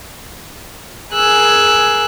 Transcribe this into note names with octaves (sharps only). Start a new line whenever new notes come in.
G#4 A#4 G#5 E6 F#6